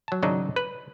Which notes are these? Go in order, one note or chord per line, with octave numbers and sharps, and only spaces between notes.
F#3 A5
G#1 C#3 F#3 D4 D#4 D5
B4